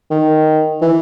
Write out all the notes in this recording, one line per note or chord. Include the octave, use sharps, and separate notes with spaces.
D#3
E3